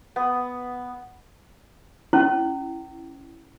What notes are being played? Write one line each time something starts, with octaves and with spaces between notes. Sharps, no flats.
B3
C#4 E4